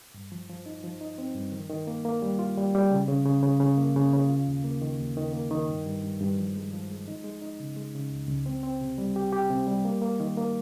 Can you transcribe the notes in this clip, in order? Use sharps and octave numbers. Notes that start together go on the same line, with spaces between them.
G2
F3
F3
D#4
F3
D#4
C4
G2
D#3
D#3
A#3
A#3
G3
F4
G3
G3
C#3
C#3
C#3
C#3
C#3
A#3
C#3
C#3
F4
D#2
A#3
D#3
D#2
D#3
A#3
D#3
G2
G2
G2
G2
F3
G#3
F3
G#3
D#4
G#3
D#4
C#3
G#3
C#3
C#2
C#2
C4
C4
C3
G3
G4
G4
C3
G3
A#3
A#3
D#3
A#3